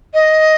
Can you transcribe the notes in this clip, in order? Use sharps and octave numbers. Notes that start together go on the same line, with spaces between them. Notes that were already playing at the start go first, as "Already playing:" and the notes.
D#5